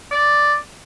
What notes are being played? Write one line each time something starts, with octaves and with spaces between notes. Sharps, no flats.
D5